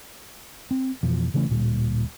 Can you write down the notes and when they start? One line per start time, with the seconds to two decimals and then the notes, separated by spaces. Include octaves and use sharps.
0.71 C4
1.03 F2 B2 E3 F3
1.34 C#3 E3 A3 C#4
1.49 D1 A#2 G3